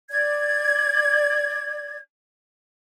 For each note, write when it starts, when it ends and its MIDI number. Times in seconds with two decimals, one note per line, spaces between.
0.10 1.97 74
0.10 1.97 92